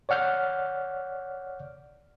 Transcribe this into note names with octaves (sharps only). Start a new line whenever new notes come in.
C#5 D5 F#5 F6 G6